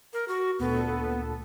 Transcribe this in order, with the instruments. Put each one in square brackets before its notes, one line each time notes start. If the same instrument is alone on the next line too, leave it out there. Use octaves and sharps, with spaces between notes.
[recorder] A#4
F#4
[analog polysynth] D2 A#2 A4 [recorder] B3